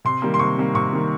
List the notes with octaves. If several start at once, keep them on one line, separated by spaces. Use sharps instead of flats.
C3 C6
D#3 G3 A#3
C6
C3 C#6
D#3 G3 A#3
C3 C#6
D#3 G3 A#3